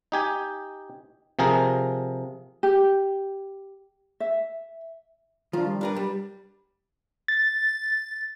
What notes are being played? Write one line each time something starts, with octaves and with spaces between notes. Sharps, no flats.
D#4 G4 G#5
C3 F3 G#4 A#4 A#5
G4
E5
D#3 F3 D4 F4
G3
D4 A#4 B4
G3
A6